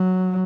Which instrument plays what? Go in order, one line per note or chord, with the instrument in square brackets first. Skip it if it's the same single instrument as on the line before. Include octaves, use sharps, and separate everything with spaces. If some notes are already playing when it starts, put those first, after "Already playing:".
Already playing: [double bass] F#3